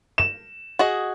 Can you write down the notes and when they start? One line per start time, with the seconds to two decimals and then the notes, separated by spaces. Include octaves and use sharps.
0.18 E7
0.79 F#4 G#4 D#5